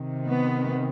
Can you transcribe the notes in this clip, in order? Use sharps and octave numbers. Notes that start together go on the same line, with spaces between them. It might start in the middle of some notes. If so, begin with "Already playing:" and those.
Already playing: C3 D#3
B3